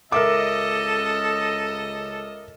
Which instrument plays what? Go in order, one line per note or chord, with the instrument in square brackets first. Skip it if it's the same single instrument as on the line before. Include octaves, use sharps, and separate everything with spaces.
[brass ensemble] C#2 C#3 D#5 [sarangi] A4 [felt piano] A#4 E5 D6